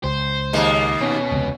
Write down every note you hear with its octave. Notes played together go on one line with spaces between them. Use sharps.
C#2 C5
D#2 G#3 A#3
B2 C#4
E1 C#2 C3